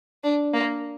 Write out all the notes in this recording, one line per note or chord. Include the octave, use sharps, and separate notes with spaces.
D4
A#3